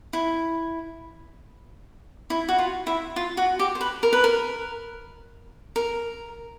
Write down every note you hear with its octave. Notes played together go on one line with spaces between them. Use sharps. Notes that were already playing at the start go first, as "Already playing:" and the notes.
E4
E4
F#4
F4
E4
F4
F#4
G4
C5
B4
A#4
B4
A#4
A#4